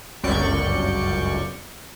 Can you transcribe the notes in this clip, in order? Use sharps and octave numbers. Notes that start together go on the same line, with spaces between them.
G1 C#2 F#2 D5 C#6 G6